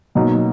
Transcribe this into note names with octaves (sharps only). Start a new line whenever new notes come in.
B2 F#3 A#3 D#4